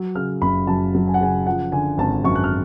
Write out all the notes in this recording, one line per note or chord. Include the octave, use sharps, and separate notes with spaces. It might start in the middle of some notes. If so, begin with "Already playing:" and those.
Already playing: F#3
C#3 F6
F#1 B5
F#2 A5
F#3
G#5
F#5
C#3 G#5
F3 F#5
D3 G#5
G#1 A5
F#2 C#6
F#6
F6